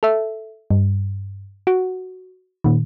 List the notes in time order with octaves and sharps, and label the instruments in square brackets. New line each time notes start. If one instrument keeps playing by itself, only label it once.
[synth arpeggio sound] A4 E5
G2
F#4
A#2 D#3